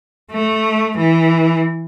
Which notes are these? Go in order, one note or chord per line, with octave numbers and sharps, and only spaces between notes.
A3
E3